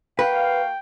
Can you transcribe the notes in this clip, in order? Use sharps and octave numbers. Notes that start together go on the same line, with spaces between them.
A#3 F#4 B4 F5 G5